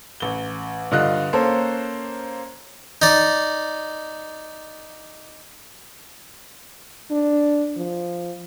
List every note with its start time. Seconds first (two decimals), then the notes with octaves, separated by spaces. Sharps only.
0.20 A1 G7
0.91 G2 D3 F4 D#5 F#6
1.33 A#3 C#4 A4 C5
3.02 D#4 D5
7.11 D4
7.77 F3